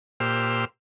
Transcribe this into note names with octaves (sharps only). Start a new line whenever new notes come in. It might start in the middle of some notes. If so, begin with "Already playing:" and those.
A#2 G4 C5 E6 F6